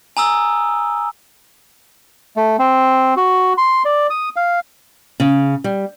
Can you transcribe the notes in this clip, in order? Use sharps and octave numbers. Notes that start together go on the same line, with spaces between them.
G#5 A#5 D#6 E6
A3
C4
F#4
C6
D5
D#6
F5
C#3
G3